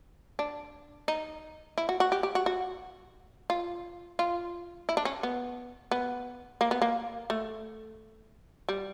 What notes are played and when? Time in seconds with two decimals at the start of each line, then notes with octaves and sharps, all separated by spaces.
0.39 D4
1.08 D#4
1.78 E4
1.89 F#4
2.00 F#4
2.12 G4
2.23 G4
2.35 F#4
2.46 F#4
3.50 F4
4.19 F4
4.89 E4
4.97 D4
5.05 C#4
5.23 B3
5.91 B3
6.61 A#3
6.71 B3
6.82 A#3
7.30 A3
8.69 G3